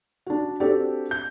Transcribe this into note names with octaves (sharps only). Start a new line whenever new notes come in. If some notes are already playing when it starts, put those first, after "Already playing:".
D4 F#4
C4 D4 F#4 G4 A4 D5
G6